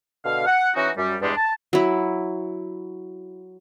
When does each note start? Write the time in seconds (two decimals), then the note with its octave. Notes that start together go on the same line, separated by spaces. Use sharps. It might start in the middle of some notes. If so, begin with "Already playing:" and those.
0.25 B2 D3 F5
0.46 F#5
0.75 E3 C#4 D#4 F#4
0.97 F#2 G3
1.22 E2 G2 G3 G#3 D4
1.36 A5
1.73 F#3 E4